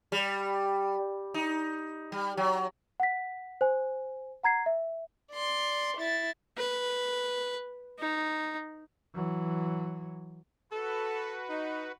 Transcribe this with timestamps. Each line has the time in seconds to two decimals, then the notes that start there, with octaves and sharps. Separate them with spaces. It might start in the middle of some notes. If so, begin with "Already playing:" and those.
0.12 G3
1.34 D#4
2.12 G3
2.37 F#3
3.00 F#5 B6
3.61 C5 G#5
4.43 F#5 A#5 G#6 C7
4.66 E5
5.33 D5 C6
5.98 E4 A6
6.58 B4
7.99 D#4
9.14 E3 F#3
10.72 F#4 A4 B4
11.50 D#4